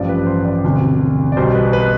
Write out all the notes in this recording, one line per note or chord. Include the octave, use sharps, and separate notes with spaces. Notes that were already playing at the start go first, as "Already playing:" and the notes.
Already playing: A1 G2 F3 D5
B4
C5
D5
E1 D2 C3
D5
B1 B2 G3 C5
B4
B4